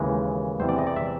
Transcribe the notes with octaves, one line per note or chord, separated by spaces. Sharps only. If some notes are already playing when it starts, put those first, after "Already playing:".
Already playing: D#2 C#3 E3 G#3
E2 C3 E3 C5
D5
D#5
D5
E5